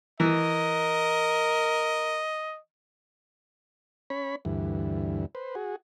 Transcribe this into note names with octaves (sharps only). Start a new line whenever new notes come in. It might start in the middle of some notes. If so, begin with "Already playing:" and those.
E3 A#4 D#5
C#4 C#5 B5
D2 G2 E3
B4 C5
F#4 G#4